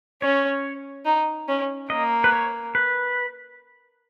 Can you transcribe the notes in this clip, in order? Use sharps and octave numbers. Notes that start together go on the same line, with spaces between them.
C#4 C#5
D#4
C#4
A#3 D#5
B4
C#5
B4